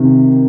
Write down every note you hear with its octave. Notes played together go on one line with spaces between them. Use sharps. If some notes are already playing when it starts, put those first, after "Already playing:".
Already playing: C3 D#3